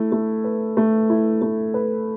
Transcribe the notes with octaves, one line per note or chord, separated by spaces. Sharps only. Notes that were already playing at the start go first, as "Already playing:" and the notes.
Already playing: A3 E4
A3
B4
A3
E4
A3
B4